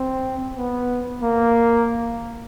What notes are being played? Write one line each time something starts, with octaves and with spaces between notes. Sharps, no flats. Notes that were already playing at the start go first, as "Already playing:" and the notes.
Already playing: C4
B3
A#3